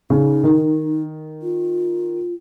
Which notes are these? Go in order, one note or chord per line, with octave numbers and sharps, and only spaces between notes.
C#3 D#4
D#3
F4